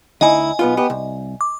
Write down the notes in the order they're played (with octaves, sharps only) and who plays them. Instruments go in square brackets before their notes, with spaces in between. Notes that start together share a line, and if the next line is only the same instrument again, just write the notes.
[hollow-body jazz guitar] D2 D#4 E4 [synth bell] D#5 G#5
[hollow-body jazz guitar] B1 B3 F4
B3 G4
C2
[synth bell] D6